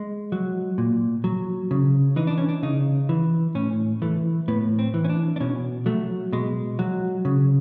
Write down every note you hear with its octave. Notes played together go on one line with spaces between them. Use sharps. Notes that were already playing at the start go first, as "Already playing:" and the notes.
Already playing: G#3
F#3
A#2
F#3
C#3
E3 D#4
D4
C#4
D4
C#3 D#4
E3
A2 C#4
E3 A3
A2 B3
C4
E3
C#4
D4
D4
B2 C#4
F#3 A3
B2 G#3
F#3
C#3